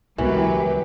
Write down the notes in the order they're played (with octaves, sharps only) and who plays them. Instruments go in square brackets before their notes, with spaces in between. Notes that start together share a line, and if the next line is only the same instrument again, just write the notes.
[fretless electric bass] C#2 B2 G#3 [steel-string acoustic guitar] F#2 [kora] E3 [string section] F#3 G4 B4